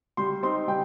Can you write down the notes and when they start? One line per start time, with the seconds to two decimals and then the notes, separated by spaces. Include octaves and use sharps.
0.17 G3 C6
0.43 C4 D#4 C6
0.68 G3 G5